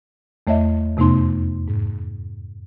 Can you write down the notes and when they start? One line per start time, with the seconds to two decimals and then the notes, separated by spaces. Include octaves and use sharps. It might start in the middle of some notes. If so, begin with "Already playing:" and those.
0.47 E2 A3 C#5 D#5 E5
0.97 F2 C3 A3 B3 D#4 C6
1.68 G#2